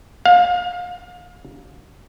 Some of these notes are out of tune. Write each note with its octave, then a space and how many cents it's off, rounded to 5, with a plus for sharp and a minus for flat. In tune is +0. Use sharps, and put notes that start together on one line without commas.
F5 +30